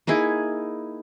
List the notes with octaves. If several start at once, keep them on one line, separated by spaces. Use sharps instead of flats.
A#3 D#4 E4 G#4